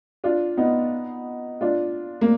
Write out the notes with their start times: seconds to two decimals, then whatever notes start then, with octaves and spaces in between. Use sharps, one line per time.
0.24 D4 F4
0.57 B3 D#4
1.61 D4 F4
2.21 A#3